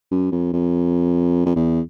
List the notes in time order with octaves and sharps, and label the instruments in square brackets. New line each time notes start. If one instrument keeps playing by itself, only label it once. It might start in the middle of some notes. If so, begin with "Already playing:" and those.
[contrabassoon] F#2
F2
F2
F2
E2